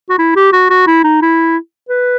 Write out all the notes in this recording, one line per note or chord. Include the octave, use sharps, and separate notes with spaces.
F#4
E4
G4
F#4
F#4
E4
D#4
E4
B4